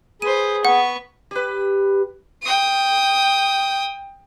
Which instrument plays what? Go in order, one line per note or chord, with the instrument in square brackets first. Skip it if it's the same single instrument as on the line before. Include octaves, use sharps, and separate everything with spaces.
[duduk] G#4 [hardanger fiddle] B4 C5 [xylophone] D#7
[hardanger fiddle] B3 C#6 [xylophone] F#5
[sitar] G4 B4
[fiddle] G5 D#6